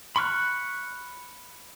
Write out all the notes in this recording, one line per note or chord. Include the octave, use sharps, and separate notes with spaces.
B5 C#6 F6 F#6